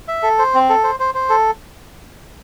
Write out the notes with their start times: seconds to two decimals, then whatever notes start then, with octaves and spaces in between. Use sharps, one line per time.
0.08 E5
0.23 A4
0.39 C5
0.54 C4
0.69 A4
0.84 C5
1.00 C5
1.15 C5
1.29 A4